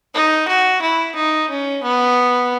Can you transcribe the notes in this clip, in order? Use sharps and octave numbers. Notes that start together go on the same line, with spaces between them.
D#4
F#4
E4
D#4
C#4
B3